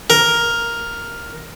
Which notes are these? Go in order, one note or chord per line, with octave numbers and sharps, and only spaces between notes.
A#4